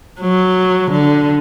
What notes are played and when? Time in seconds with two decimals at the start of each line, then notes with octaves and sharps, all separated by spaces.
0.21 F#3
0.91 D3